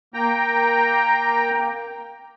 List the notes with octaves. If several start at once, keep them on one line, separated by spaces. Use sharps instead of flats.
A#3 G5 A#5